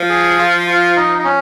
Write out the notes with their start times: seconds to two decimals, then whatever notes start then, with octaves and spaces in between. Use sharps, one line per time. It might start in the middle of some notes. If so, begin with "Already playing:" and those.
Already playing: F3
0.09 G#4
0.39 F4
0.67 F4
0.96 D#4
1.19 D#4
1.24 C#4